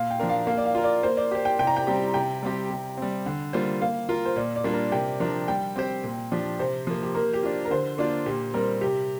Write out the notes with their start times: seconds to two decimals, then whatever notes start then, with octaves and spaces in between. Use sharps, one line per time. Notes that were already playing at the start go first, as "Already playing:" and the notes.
Already playing: A#2 F5
0.10 G5
0.20 F3 D4 A#4
0.29 F5
0.47 A#3 F5
0.57 D5
0.65 F5
0.75 F4 A#4
0.84 D5
1.03 A#3 C5
1.17 D5
1.31 G4 C5
1.45 G5
1.59 C3 G5
1.67 A#5
1.77 G5
1.87 G3 C4 G4
2.14 C3 G5
2.43 G3 C4 G4
2.70 C3
2.98 G3 C4
3.26 D3
3.53 G3 A#3 F4 C5
3.81 A#3 F5
4.09 F4 A#4
4.25 C5
4.36 A#2 D5
4.56 D5
4.64 G3 A#3 D4 F4
4.73 A#4
4.92 C3 G5
5.20 F3 D4 A#4
5.48 G3 G5
5.76 C4 G4 C5
6.03 A#2
6.32 F3 D4 G4
6.59 C3 C5
6.87 F3 A#3
7.03 G4
7.14 A#3 A#4
7.33 G4
7.43 D4 F4
7.65 A#4
7.71 D3 C5
7.98 A#3 D4 F4 D5
8.26 A#2 G4
8.54 G3 C4 A#4
8.81 C3 G4